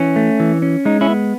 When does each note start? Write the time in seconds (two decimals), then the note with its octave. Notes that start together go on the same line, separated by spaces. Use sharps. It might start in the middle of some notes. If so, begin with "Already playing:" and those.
Already playing: E3 C#4
0.16 A3
0.40 E3
0.62 C#4
0.85 G#3 D#4
1.01 C#4 E4
1.09 B3